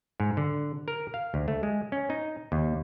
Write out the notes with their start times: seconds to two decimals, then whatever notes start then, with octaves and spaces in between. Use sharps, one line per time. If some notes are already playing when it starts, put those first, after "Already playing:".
0.20 G#2
0.37 D3
0.88 A#4
1.14 F5
1.34 D2
1.48 A3
1.63 G#3
1.92 C#4
2.10 D#4
2.52 D#2